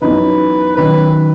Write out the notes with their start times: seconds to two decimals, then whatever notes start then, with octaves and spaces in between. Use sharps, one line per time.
0.02 F#2 E3 B3 D#4 B4
0.77 D#3 F#3 C#4 B4